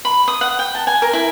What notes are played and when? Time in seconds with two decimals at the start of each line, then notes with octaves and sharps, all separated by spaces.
0.05 B5
0.28 D#6
0.41 F#5
0.59 G5
0.75 A5
0.87 G#5
1.02 A#4
1.13 E4